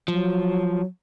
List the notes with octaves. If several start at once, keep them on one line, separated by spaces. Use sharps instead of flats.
F3 F#3